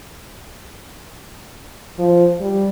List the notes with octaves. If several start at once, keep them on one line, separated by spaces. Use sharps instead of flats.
F3
G3